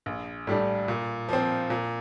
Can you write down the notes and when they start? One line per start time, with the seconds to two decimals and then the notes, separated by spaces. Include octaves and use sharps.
0.06 A#1
0.47 A2 G3 D4
0.88 A#2
1.29 F3 C4
1.70 A#2